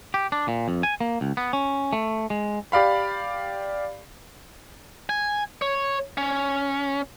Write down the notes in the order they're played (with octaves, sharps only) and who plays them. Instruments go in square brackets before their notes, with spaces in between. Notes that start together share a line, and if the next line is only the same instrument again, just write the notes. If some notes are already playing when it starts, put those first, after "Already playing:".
[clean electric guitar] G4
D4
A#2
F2
G#5
A#3
C#2
B3
C#4
A3
G#3
[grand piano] G4 D5 F5 B5
[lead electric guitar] G#5
C#5
C#4